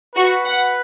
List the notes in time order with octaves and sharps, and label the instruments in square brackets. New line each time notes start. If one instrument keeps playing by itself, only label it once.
[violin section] F#4 [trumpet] B4
[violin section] F#5